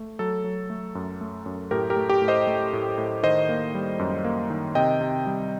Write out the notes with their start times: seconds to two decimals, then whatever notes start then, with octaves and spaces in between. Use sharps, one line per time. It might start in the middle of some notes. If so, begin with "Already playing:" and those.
Already playing: A3
0.19 F#3 A4
0.44 F#3
0.70 A3
0.95 F#2
1.21 A3
1.46 F#2
1.71 A2 G4 A#4
1.90 G4 A#4
1.96 A3
2.09 G4
2.22 A2
2.28 C5 D#5
2.47 A3
2.73 A2
2.98 A2
3.23 D#3 C5 D#5
3.49 A#3
3.74 G3
3.99 F#2
4.24 A#3
4.50 D#3
4.75 C3 D#5 G5
5.01 C3
5.26 G3